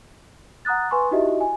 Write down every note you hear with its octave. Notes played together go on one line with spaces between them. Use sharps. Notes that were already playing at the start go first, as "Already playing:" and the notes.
F#5 A#5 D#6 F#6 A6
B4 G#5 C6 C#6
D#4 E4 F#4 G4 D#5 E5
G#5